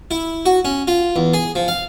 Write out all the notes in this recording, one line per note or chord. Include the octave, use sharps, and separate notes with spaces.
E4
F#4
C#4
F4
E2
G#4
F3
F5